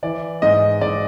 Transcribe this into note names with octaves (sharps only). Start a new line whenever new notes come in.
E3 D5
G#2 D#5
G#2 D5